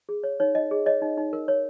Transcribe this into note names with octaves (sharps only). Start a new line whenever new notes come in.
G#4
C#5
D#4 C#5
D#4 D#5
G#4
C#5 D#5
D#4
D#4
A#4
C#5